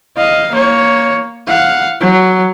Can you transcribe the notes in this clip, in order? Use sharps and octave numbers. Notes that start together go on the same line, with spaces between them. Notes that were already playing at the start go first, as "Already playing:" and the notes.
D#5 F5
A#3 C#5
F5 F#5
F#3